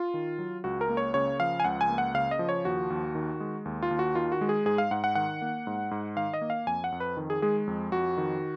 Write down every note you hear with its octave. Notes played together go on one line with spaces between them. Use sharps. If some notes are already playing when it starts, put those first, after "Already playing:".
Already playing: F4
D#3
F#3
C#2 F#4
A#4
A#3
C#5
C#3 C#5
F3 F5
G#5
C#2 F#5
G#5
A#3
F#5
C#3 F5
D#5
F3
C#5
D#2 F#4
D#2
D#3
G#3
D#2
F4
D#2
F#4
D#3 F4
F#4
G#3
G#4
G#2 G#4
F5
G#2 F#5
F#5
D#3 F#5
A#3
G#2
G#2
D#3 F5
D#5
A#3
F5
F2 G#5
F#5
F2
B4
D#3
G#4
G#3 G#4
F2
F2 F#4
D#3